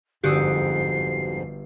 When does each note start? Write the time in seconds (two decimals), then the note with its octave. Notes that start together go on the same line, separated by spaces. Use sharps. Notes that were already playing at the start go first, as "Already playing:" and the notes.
0.24 G1 F2 G#2 F#4 G4 D#6 E6 C7